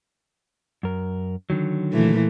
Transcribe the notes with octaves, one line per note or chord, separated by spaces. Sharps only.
F#2 A#4
D3 D#3 F#3
A#2 E3 A3